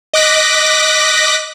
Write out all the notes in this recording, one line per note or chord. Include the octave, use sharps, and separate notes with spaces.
D#5 D6 F#6 A#6 B6